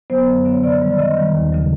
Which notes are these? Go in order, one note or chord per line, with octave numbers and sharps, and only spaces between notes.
D3 F#3 B3 C5
F#2
D3 F#3 B3
C#5
C3 D5
D#3 G3
D5
C3 D#5
D#3 G3
D#2
C#3 F#3